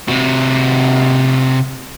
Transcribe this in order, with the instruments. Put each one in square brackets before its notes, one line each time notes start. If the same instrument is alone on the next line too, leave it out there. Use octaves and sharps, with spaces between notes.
[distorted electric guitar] C3 F#4